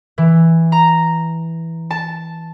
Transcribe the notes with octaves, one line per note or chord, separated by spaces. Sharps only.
E3
A#5
A5